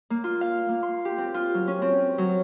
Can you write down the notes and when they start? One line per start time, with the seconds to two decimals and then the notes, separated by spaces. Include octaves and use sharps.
0.10 A#3
0.24 F4
0.41 F5
0.69 A#3
0.83 C6
1.05 G4
1.18 C4
1.34 F4
1.54 F#3
1.68 C#4
1.82 C4
2.18 F#3